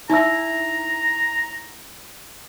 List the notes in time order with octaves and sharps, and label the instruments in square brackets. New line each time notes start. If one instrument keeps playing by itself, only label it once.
[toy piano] D#4 E5 E6 [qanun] E4 [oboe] A#5